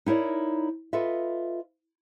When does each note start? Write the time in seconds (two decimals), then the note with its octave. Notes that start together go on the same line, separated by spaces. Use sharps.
0.06 D#4 E4 A#4 C#5 D5
0.93 F4 A4 B4 D#5 E5